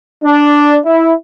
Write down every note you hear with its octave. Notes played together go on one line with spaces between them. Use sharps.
D4
E4